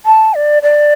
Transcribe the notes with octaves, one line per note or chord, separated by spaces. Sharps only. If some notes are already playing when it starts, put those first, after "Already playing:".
A5
D5
D5